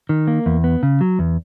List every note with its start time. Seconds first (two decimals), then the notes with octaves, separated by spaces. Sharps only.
0.09 D#3
0.28 A#3
0.46 E2
0.64 B3
0.83 C#3
1.01 F#3
1.19 E2